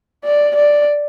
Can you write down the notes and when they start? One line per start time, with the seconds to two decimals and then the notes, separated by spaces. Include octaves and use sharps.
0.24 D5
0.56 D5